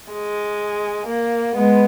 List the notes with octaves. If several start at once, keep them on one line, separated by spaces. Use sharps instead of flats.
G#3
A#3
G#3 B3